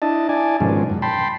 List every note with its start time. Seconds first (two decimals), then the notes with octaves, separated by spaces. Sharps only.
0.02 D4 E4 D#5 A5
0.29 E4 D5 G#5 A5
0.60 G#2 B2 D#3 F3 G#3 C#4
0.90 F#2
1.02 G5 A5 B5 C6